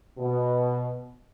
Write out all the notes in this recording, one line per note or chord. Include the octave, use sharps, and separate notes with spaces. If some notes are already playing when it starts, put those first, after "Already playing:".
B2